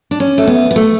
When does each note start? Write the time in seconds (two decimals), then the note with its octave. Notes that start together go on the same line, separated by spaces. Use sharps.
0.11 D4
0.20 C#4
0.38 A3
0.47 B3
0.71 B3
0.76 A3